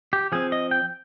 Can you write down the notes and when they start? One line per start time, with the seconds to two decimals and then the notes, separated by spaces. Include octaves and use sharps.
0.13 G4
0.32 F3 C4 G#4
0.52 D#5
0.71 G5